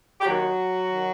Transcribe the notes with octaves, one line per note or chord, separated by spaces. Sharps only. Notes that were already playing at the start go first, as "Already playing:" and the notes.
G4
D#2 D#3 F#3 F#4
D#3